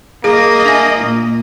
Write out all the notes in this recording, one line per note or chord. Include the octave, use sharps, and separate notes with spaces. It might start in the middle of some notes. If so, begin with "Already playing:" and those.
A#3 G#4 D#5
D4 E5 G#5
A#2